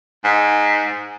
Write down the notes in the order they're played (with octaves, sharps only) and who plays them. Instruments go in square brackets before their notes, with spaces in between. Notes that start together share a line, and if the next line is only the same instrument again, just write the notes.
[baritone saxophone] G#2